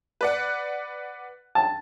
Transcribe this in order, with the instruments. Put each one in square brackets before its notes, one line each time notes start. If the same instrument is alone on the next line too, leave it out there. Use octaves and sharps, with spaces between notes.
[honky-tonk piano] B4 D5 F#5
[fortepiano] A5